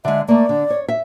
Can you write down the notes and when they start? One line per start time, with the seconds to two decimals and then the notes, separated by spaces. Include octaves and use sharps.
0.05 D3 G#3 E5
0.28 A3 A#3 D5
0.49 D3
0.70 C#5
0.88 E5